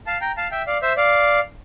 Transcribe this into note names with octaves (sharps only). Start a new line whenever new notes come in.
F5 A5
G5 A#5
F5 A5
E5 G5
D5 F5
C5 E5
D5 F5